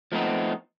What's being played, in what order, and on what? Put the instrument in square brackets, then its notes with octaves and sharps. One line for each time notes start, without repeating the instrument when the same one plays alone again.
[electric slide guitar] F3 A3 B3 C4 D#4